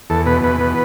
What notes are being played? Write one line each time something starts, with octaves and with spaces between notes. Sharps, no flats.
E2 A4
B2 B4
E2 B4
B2